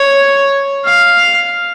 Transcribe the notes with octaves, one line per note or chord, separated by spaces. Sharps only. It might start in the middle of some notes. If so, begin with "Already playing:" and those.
Already playing: C#5
F5